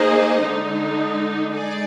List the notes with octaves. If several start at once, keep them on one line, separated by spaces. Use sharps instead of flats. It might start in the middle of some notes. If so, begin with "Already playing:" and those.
Already playing: A#3 D#4 G#4 C5 D#5
D3 G#3 D#4
G#3 D#4 G#4 D5